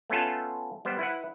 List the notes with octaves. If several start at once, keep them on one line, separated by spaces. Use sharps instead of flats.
A3 B3 C#4 F4 A4
G3 B3 C5
E4 B4 F#5